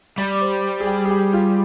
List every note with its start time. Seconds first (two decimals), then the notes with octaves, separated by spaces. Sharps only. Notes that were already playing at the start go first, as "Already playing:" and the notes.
0.18 G3 D5
0.41 C5
0.80 G#4
0.87 G4
1.05 G#4
1.11 G4
1.33 F4